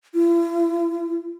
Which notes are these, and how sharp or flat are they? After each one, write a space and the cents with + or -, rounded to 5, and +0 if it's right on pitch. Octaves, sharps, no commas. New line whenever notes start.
E4 +40